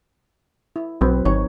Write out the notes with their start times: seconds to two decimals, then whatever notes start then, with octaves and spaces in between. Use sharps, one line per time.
0.76 E4
1.01 B1 F#3 C4 B4
1.25 G#1 D#4 C#5